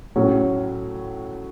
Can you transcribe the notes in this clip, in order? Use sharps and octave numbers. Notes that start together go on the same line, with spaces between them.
A2 F#3 A3 C#4